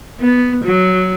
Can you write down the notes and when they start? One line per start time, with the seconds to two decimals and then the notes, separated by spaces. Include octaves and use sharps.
0.20 B3
0.65 F#3